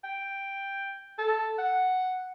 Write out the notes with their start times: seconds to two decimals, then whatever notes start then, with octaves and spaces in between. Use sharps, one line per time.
0.04 G5
1.19 A4
1.59 F#5